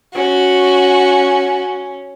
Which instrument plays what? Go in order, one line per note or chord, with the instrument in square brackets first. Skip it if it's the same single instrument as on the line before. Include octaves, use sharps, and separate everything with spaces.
[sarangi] C#4 [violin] F#4